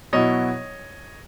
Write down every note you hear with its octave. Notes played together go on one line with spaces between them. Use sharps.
B2 F#3 B3 E4 C#5 D#5